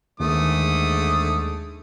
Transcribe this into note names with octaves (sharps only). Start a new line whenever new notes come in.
D#2 G#2 D3 A3 D#6